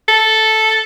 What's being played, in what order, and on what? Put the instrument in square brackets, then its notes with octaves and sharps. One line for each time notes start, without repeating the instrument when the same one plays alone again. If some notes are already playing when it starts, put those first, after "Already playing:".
[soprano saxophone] A4